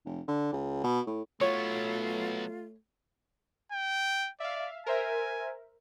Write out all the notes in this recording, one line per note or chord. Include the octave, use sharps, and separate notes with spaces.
F1
D3
C#2
B2
A2
F#3 A3 B3 F4 C#5
G5
D5 E5 F5
A#4 C5 E5 G#5